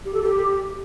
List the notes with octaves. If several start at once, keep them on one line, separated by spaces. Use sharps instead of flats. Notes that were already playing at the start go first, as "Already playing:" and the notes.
G4
A4
G4